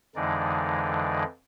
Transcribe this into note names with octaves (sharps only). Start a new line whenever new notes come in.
F2 D3 E3 G#3 D#4 D5